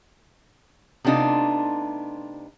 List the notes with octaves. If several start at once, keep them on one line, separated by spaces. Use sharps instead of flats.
C3 A3 B3 D4 D#4 F4